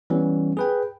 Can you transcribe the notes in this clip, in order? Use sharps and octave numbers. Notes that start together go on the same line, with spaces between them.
E3 G3 B3 C#4
G#4 B4 G5